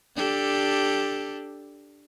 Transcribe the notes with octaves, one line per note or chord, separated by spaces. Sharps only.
D4 G4 A4